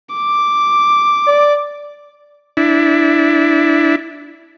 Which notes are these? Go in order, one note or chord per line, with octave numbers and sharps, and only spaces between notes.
D6
D5
D4 E4